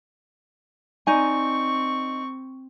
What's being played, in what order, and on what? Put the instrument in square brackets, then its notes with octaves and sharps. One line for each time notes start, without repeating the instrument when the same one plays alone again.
[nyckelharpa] C4 C#6 [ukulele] D#4 D5 G#5